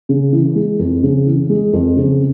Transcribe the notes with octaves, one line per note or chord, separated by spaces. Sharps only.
C#3
E3
G#3
F2
C#3
E3
G#3
F2
C#3